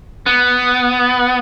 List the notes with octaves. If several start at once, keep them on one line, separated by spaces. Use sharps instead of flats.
B3